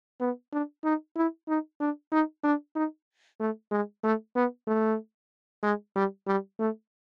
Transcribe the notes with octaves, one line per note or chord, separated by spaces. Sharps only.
B3
D4
D#4
E4
D#4
D4
D#4
D4
D#4
A3
G#3
A3
B3
A3
G#3
G3
G3
A3